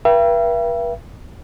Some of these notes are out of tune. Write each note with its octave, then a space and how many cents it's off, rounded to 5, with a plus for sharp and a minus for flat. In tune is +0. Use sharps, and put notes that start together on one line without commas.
B4 -40 E5 +40 G5 -20